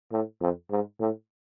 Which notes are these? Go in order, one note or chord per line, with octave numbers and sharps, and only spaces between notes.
A2
F2
G#2
A2